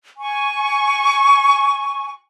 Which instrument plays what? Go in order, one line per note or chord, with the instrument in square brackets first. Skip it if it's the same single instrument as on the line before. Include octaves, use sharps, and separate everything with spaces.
[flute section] G#5 C#6